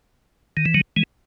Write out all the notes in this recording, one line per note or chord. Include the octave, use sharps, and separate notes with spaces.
D#3
E3
D#3 F#3
E3 G#3